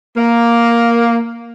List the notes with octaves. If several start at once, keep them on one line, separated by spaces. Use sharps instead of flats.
A#3